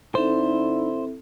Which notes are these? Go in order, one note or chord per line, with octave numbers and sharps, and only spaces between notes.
D3 C4 D#4 E4 A4 C5